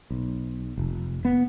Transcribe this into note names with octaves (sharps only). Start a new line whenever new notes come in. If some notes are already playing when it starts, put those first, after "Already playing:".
B1
F1
B3